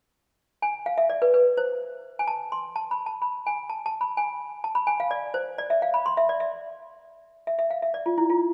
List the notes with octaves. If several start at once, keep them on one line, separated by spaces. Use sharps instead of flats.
G#5
F5
E5
D5
B4
B4
C5
G#5
A5
C6
A5
B5
A5
B5
G#5
A5
A5
B5
G#5
A5
B5
G#5
F5
D5
C5
D5
E5
F5
B5
C6
E5
D5
E5
E5
E5
F5
E5
D5
F4
E4
F4